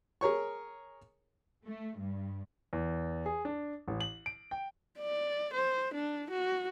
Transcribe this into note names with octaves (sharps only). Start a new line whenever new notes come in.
G#4 A#4 C#5 C#6
A3
G2
E2
G#4
D4
A1
F#7
D7
G5
D5
C5
D4
F#4